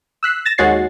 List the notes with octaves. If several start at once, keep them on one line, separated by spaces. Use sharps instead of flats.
E6 F#6 B6 C7
A6 A#6 E7
D#2 G#3 F#4 C#5 A6 C7